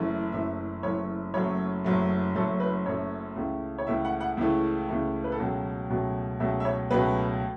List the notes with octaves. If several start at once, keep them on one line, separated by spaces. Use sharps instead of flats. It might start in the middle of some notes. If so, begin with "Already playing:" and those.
Already playing: F#1 F#2 E3 A3
F#1 F#2 E3 A3 E5
F#1 F#2 E3 A3 C#5
F#1 F#2 F#3 A3 C#5
F#1 F#2 F#3 A3
F#1 F#2 F#3 A3 A4
B4
F#1 F#2 F#3 A3 C#5
C#2 C#3 E3 A3
C#5
C#2 C#3 E3 A3 E5
F#5
F#5
C#2 C#3 E3 A3 E4
C#2 C#3 E3 A3
B4
A4
C#2 B2 F#3 A3 F#4
C#2 B2 F#3 A3
C#2 B2 F#3 A3 E5
E5
C#5
C#2 B2 F#3 A3 B4